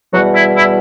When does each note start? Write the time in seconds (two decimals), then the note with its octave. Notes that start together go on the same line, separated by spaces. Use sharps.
0.12 E2 B2 F#3 G3 F#4
0.34 E4
0.56 E4